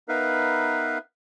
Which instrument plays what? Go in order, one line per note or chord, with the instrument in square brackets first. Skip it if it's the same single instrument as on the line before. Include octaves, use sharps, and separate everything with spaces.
[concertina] B3 D#4 A#4 B4 E5 F5